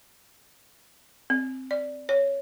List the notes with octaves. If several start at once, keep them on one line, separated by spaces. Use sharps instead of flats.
C4
D5
C#5